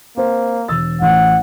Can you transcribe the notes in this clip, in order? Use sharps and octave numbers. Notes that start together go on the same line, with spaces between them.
A#3 C4 C5
E1 E6 A6
A1 F#5